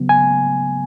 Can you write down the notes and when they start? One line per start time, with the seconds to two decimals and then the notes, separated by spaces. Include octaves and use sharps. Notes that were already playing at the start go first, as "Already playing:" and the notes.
Already playing: C#3 F#3 B3
0.09 G#5